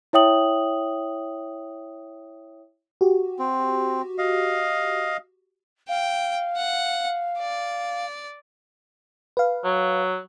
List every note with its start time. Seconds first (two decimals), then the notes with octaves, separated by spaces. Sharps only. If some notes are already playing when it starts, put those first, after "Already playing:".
0.13 E4 C#5 E5 G5 D#6 F#7
3.01 F#4 G4
3.39 C4
4.18 D#5 F5
5.89 F5 G5
6.56 F#5
7.39 D5
9.37 B4 F5
9.64 F#3